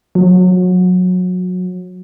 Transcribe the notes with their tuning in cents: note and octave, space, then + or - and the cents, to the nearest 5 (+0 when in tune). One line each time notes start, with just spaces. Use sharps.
F#3 -25